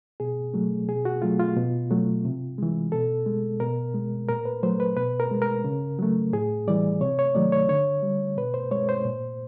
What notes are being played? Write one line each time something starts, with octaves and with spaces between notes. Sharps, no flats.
B2 G#4
F#3 A3
B2 G#4
F#4
F#3 A3 F4
F4
B2
F#3 A3
C3
E3 G#3
B2 A4
G#3
B2 A#4
G#3
A#2 A#4
B4
F#3 A3 C5
B4
B2 B4
A#4
G#3
A#4
C#3
F#3 A3
A2 G#4
E3 G3 D5
C3 C#5
C#5
D#3 F#3 A3 D5
C#5
D3 C#5
G3
B2 B4
C5
G#3 C#5
C5
A#2